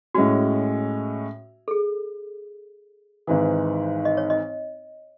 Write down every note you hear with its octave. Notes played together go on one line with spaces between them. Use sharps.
A2 G#3 C#4 F#4
A4
G#4
G#1 G#2 E3
D#5
C#5
D#5